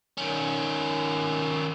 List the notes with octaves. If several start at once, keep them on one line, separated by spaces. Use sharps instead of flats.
D#3 C#4